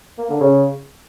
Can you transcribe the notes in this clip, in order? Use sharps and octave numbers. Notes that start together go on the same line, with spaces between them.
A#3
D3
C#3